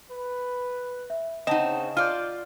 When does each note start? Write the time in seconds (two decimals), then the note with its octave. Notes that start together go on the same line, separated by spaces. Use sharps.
0.11 B4
1.10 E5
1.47 C#3 C4 D#4 D#5 F#5 A5 E7
1.97 F4 D5 F6 G6